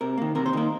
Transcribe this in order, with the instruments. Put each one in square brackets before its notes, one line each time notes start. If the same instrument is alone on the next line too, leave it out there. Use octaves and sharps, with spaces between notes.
[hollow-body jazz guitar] C3 A#4
D#3 A#3
C3 A#4
C5
D#3 A#3 A#4